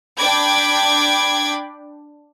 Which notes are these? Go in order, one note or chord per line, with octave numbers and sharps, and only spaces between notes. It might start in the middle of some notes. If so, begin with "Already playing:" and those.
D4 G5 B5 D6 G#6